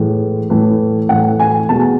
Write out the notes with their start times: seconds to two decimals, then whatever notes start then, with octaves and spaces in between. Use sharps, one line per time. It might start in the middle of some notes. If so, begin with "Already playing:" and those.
Already playing: A2 E3 G#3
0.50 A2 E3 A3
1.09 A2 E3 A3 F#5
1.40 G#5
1.69 B2 G#3 A5